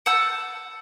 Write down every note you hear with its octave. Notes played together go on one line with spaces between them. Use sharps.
F#5 A5 E6 G6